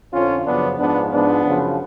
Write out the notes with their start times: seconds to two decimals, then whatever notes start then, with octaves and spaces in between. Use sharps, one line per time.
0.13 F2 D3 F3 C#4 F4
0.46 F#2 C#3 F3 B3 D4
0.79 G#2 F3 B3 D4
1.12 G#2 F3 B3 D4
1.45 F#2 C#3 F3